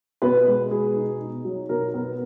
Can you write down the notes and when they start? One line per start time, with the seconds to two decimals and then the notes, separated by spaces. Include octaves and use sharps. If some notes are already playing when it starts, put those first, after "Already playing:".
0.22 B2 B3 B4
0.47 G#3
0.71 B2 G#4
0.96 D#4
1.20 D#4
1.45 F#3
1.69 B2 A#4
1.94 B3